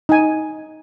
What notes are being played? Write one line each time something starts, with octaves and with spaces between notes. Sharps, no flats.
D#4 G#5